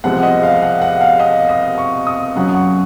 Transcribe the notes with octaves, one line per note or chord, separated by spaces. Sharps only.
C2 C3 F3 G#3 F#5
D#5
F5
F#5
F#5
F5
D#5
D#5
C#6
D#6
F#2 C#3 F#3 F#5
C#6